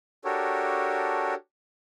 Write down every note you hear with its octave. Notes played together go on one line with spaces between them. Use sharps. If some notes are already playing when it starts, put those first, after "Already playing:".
D4 F#4 G4 A4 A#4 C#5